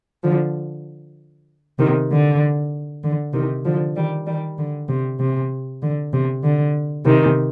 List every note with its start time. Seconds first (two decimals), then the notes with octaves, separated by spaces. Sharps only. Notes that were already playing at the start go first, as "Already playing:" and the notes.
0.23 D3 F3
1.78 C3 D#3
2.10 D3
3.03 D3
3.33 C3 D#3
3.64 D3 F3
3.95 D#3 G3
4.26 D#3 G3
4.58 D3
4.88 C3
5.20 C3
5.82 D3
6.13 C3
6.43 D3
7.05 C3 D#3